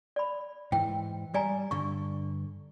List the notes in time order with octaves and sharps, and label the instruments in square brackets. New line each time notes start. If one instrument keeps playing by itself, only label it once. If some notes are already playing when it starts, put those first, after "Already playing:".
[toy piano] D5 B5
[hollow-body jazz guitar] G#2 E3 [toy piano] G5
[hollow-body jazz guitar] G3 [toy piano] D5 G#5 A#5
[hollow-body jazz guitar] G2 D3 [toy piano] C#6